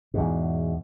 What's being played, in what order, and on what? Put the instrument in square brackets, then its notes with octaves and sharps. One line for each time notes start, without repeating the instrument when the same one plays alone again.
[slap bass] E2 G#2 B2